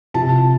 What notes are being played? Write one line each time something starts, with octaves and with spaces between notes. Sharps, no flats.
C3 F3 A5